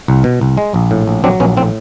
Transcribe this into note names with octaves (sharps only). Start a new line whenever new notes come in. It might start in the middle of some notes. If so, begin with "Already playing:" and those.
C2
B2
C2
G#3
A#1
A2
A#1
F#3 C4 D4
A#1 B3 C#4
A2 C4